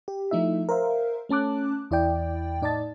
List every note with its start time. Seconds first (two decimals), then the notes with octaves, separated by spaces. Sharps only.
0.08 G4
0.31 F3 A3 D#4 E4 E5
0.69 A#4 C5 E5 F5
1.29 A3 C#4 A5 D6 F#6
1.91 E2 E4 D5 G5
2.62 A2 D#4 D5 D#5 A5 A6